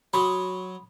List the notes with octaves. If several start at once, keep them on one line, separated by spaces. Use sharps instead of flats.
F#3 B5 C6 D#6